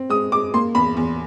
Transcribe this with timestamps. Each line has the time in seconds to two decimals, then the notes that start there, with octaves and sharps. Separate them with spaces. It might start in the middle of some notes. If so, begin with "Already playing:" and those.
Already playing: C4
0.10 G#3 D#6
0.32 G#3 D6
0.54 A#3 C6
0.75 E2 B5
0.97 E2